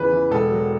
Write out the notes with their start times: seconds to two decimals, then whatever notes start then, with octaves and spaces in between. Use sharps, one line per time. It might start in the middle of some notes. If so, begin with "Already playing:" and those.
Already playing: E2 C#3 E3 F#3 B4
0.12 E3
0.31 E1 A4
0.51 F#3